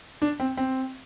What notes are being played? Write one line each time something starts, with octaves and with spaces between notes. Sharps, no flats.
D4
C4
C4